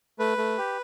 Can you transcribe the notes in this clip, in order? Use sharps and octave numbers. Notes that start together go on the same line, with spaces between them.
A3 B4
A3
G4